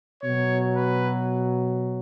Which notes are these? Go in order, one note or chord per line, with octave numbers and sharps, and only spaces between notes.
B2 F#3 C#5
B4